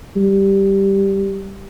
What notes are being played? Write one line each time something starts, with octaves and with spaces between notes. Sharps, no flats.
G3